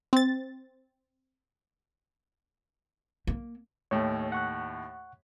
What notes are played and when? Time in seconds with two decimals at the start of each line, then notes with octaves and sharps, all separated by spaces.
0.13 C4 A6
3.27 A#3
3.91 D#2 A2 C#5
4.32 F#5 C#6 F#6